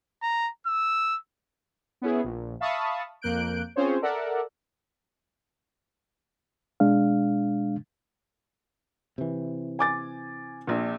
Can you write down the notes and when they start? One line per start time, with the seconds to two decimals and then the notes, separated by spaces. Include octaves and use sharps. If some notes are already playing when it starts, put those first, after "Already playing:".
0.22 A#5
0.67 E6
2.02 B3 C#4 E4 G#4
2.24 A#1
2.60 E5 F5 A5 B5 C#6 D#6
3.22 F2 A#3 F#6 G6 D7
3.76 C4 C#4 F4 G#4 C5 C#5
4.02 A4 A#4 D5 E5 F#5
6.80 B2 G#3 D4 F5
9.18 C3 E3
9.79 G#5 D6 A6
10.67 A#1 A#2